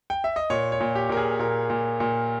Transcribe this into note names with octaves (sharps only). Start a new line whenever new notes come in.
G5
E5
D#5
A#2 C#5
C#5
A#2
G4
A#2 A#4
G#4
A#2 A#4
A#2
A#2